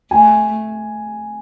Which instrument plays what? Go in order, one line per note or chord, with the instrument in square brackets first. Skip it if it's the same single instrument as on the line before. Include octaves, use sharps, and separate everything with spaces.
[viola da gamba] A3 [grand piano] G#5